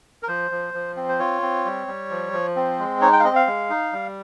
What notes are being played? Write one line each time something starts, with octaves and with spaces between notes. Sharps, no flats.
A#4
F3 C5
F3
F3
C4
C5
F4 C#5
C4
G3
G3
F3
F3
C4
G#3
D#4 C#5
G5
F5
C4 D#5
F5
G#3
D#4
G3